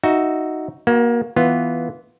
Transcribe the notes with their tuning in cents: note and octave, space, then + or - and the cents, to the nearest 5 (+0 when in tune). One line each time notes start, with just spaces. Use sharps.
D#4 +0 F#4 +0 E5 +0
A#3 +25 F#4 +0
E3 +0 B3 -5 F4 +0